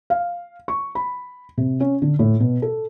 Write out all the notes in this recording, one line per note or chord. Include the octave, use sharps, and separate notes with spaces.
F5
C#6
B5
C3
C#4
D3
A2
B2
A4